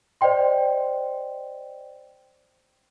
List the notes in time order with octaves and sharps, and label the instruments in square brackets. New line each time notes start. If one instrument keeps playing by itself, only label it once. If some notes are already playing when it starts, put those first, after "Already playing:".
[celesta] C5 D5 D#5 G5 C6